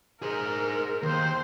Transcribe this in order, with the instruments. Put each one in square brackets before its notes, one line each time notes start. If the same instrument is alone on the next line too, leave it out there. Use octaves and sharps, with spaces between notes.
[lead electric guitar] G#4 C5 [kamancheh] A#4
[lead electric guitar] D#2 [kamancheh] C5